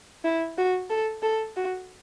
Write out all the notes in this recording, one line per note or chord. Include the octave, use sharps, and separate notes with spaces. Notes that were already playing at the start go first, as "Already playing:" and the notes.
E4
F#4
A4
A4
F#4